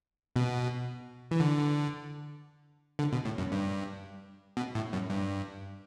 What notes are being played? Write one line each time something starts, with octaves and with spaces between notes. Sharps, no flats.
B2
E3
D3
D3
B2
A2
F#2
G2
B2
A2
F#2
G2